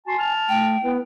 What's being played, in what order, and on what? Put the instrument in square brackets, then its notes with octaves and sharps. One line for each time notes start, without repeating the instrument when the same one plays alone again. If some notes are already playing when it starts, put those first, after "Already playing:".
[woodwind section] F#4 A5 C6 [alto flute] G#5
[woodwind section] A5 F6
[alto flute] A3 [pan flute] G5
[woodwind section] B3 E4 [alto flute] B4